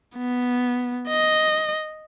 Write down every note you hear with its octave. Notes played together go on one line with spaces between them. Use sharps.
B3
D#5